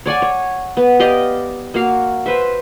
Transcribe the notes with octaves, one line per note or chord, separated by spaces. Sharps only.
C#5 D5 F#5 G#5
C#5
B3
G4 D5 D#5 F5
A#3 F#4 F5
B4 C5 E5